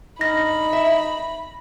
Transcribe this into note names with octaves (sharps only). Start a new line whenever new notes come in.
G2 D#4 B5 A#6
E5